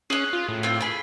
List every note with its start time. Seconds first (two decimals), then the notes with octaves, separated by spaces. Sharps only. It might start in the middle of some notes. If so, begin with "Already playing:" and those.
0.10 C#4 G#4 F#6
0.33 F4
0.48 A2
0.63 C4 F4
0.81 G#4 B5